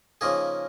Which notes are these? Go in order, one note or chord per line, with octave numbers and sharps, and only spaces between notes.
C#3 F3 A#3 D#4 G#4